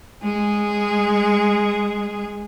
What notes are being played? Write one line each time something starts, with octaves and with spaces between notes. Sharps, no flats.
G#3 G#4